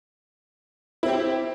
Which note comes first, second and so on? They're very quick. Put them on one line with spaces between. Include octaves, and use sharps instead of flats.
E4 C4 G4